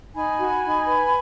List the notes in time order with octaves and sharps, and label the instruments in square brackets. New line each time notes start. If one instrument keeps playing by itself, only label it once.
[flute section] D#4 G#5 B5
F#4
D#4
B4